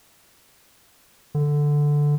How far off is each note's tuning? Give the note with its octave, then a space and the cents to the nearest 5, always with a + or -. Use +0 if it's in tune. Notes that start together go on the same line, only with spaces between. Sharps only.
D3 +0